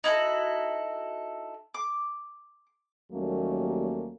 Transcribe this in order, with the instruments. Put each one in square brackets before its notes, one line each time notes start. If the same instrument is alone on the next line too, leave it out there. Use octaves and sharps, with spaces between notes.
[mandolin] D#4 E4 F#4 A4
D6
[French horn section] D#2 F#3 G3 A3 A#3 C#4